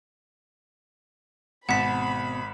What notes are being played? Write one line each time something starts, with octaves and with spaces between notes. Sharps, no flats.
G#1 B2 C4 F#5 A5 B5 B6